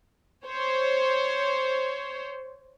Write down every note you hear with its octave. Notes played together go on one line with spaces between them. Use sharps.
C5 C#5